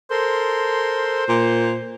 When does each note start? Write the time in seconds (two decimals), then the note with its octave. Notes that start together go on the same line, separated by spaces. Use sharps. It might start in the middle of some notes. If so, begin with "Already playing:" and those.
0.11 A4 A#4 C5 C6
1.29 A#2